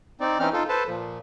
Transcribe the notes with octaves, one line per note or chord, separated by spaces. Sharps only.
C4 D#4 D5
E3 C4 C#4 D#4 F6
D#4 F4 A4
A4 B4 C5 A5
A#2 F3